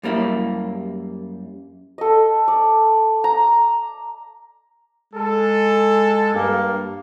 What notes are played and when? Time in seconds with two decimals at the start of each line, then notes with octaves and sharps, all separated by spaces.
0.03 F#2 G3 A#3 E4
1.98 A4 D#5
2.48 D5
3.24 A#5
5.14 G#3 A4
6.34 G2 A#3